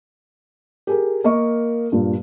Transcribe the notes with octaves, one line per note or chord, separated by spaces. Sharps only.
G4 G#4 A#4
A#3 A#4 D#5 C#6
G2 A#2